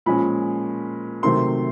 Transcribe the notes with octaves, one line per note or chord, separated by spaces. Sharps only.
A#2 F3 G#3 C#4 B5
C3 D#3 F#3 A3 C4 C6